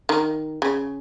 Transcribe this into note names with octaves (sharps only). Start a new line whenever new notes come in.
D#3
C#3